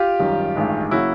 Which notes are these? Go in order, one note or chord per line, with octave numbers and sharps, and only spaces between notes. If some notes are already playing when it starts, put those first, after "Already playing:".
Already playing: F4 G4
G#1 F#2 D#3 G3
A1 G2 D#3 G#3
C#3 F#3 A#3 E4 F#4